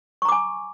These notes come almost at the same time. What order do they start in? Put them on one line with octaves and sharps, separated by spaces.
C#6 A#5 D6 G#5